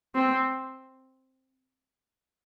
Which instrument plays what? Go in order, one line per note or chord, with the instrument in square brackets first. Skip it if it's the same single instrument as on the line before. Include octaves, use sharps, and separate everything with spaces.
[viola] C4